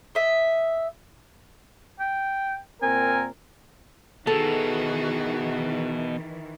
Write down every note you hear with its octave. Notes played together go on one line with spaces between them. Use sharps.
D#5 E5
G5
A#2 C4 A#4 G#5
B2 D#3 E3 F#4 G#4 A4